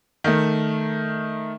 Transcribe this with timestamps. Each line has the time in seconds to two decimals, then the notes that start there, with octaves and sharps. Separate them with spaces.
0.24 D#3 A3